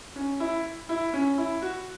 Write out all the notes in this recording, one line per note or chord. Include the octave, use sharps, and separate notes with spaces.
C#4
E4
E4
C#4
E4
F#4